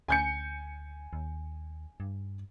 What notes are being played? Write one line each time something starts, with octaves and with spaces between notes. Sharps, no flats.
D2 G#5 G6 C#7
D#2
G2